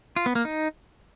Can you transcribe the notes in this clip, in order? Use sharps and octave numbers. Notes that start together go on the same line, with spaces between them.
F4
B3
A#3
D#4